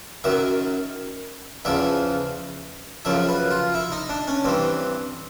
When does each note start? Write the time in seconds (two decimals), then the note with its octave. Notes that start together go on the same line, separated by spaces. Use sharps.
0.24 F#2 D#3 E5
1.65 E2 C#3 F3 E5
3.05 F#2 C#3 F3 E5
3.29 B4
3.51 F4
3.74 E4
3.92 D#4
4.09 D4
4.27 C#4
4.44 G2 E3 C4